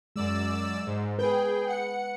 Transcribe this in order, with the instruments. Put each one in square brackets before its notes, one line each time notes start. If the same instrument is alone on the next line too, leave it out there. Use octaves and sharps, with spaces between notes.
[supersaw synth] F#2 D5 E6 [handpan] G#3
[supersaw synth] G#2
[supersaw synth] G#4 G5 [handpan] B4
[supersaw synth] F#5 C#7